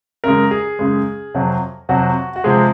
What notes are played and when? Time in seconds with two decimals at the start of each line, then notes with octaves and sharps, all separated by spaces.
0.24 F#2 C#3 G#3 A#4
0.51 G#4
0.79 F#2 C#3 G#3
1.34 F2 C3 F#3
1.89 F2 C3 F#3 F#4
2.36 F#4
2.44 C3 F3 G#3 G#4